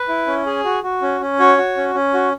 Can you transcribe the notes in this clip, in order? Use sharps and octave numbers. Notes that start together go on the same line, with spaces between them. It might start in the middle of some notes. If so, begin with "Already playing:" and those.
Already playing: B4
E4
C#4
G#4
F#4
F#4
C#4
C#4
F#4 C#5
F#4
C#4
C#4
F#4